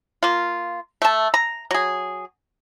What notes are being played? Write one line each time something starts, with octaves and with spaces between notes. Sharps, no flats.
A#3 F4
A3 A5
A#5
F#3 G#4